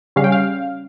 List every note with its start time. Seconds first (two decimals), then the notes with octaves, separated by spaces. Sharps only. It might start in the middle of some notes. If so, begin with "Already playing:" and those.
0.16 C#3 G3 C#4 F5
0.24 G5
0.32 F5